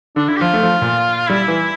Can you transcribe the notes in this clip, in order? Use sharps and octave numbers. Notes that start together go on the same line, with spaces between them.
D3 D4
D3 E4
G4
F3 F4
A3
F3
A#2
G3 E4
E3